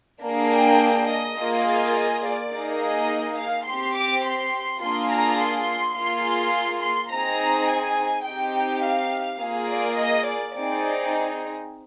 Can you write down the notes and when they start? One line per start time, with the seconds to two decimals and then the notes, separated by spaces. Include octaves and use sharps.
0.22 A#3 D4 G#4
0.52 G5
1.08 D#5
1.38 A#3 F4 G#4
1.66 D#5
1.95 D#5
2.24 D5
2.52 A#3 D#4 G#4
2.80 D#5
3.38 F5
3.66 C4 G4 C6
3.95 D6
4.24 C6
4.81 A#3 D4 F4 G#4 C6
5.10 A#5
5.39 C6
5.97 A#3 F4 G#4 C6
6.83 C6
7.11 C4 D#4 G#4 A#5
7.69 G#5
8.26 C4 D#4 G4 G5
8.83 F5
9.41 A#3 F4 G#4
9.70 D5
9.98 D#5
10.27 D5
10.55 C4 D#4 G#4 D5